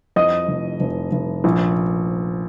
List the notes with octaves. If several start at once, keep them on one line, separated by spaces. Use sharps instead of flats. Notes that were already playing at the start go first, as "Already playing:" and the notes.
F2 D#5 D#6
F1
F1
F1
A#1